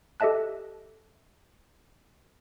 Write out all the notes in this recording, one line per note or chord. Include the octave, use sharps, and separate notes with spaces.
G4 A4 D#5 E5 A5 F#6